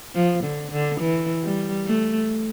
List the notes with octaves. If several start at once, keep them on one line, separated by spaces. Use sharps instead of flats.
F3
D3
D3
E3
G3
A3